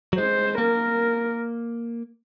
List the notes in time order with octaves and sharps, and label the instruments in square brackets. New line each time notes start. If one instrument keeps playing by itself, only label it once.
[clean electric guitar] F#3
[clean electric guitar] G#3 [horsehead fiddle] C5
[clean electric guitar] A#3 [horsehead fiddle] A#4